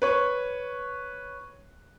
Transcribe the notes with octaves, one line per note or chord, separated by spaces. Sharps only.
B4 C#5 C#6